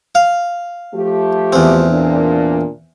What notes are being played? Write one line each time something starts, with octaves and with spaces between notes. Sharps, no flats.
F5
F3 A3 G4
E2 C4
A#2 D4